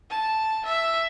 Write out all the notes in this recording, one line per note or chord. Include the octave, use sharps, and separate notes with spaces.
A5
E5